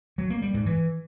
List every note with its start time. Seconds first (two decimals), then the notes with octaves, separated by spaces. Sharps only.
0.18 F#3
0.30 A#3
0.42 G3
0.54 G#2
0.66 E3